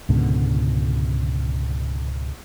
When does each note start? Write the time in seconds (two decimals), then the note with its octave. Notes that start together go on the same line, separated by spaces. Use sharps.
0.09 C#2 G#2 B2 D3